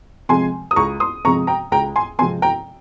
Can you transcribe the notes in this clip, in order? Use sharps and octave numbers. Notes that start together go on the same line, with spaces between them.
C3 F3 G#3 C4 G#5 C6
D#6
C#2 A#5 C#6
C6 D#6
C3 F3 G#3 C4 A#5 C#6
G5 A#5
C#2 G5 A#5
G#5 C6
C3 F3 G#3 C4 G#5 C6
G5 A#5